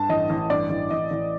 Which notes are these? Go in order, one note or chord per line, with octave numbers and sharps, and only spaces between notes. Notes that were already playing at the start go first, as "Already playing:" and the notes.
Already playing: G2 A5
A1 D#5
A1
G2 D5
A1
A1 D#5
A1